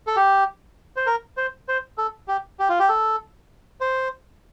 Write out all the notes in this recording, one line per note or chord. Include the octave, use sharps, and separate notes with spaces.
A4
G4
C5
A#4
C5
C5
A4
G4
G4
F4
G4
A4
C5